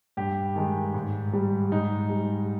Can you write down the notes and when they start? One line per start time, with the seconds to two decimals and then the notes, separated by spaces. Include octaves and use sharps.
0.17 G2 G4
0.56 D#3 G#3
0.94 G#2
1.33 G3
1.72 G#2 D#4
2.10 G3